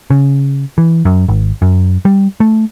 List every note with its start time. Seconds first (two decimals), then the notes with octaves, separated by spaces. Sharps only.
0.10 C#3
0.78 E3
1.05 F#2
1.28 G#1
1.62 F#2
2.05 G3
2.40 A3